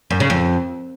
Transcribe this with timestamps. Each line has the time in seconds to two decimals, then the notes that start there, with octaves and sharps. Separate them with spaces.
0.11 F#2
0.20 C#3
0.30 F2